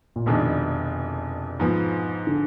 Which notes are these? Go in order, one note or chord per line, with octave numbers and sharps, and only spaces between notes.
A#2
F1 F2 B2 D#3 G#3 D4
G#2 F3 B3
D3